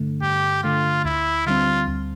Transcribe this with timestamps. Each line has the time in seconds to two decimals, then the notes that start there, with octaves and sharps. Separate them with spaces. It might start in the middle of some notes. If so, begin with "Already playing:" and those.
Already playing: G2 D3 A3
0.22 G2 G4
0.63 D3 A3 F4
1.05 D2 E4
1.46 D3 G3 C4 F4
1.87 D2